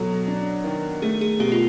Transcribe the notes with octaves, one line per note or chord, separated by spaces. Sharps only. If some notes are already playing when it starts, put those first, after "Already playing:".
Already playing: B2 F#3 A4
D4
D#3
A3 G#4
G#4
B2 G4
F4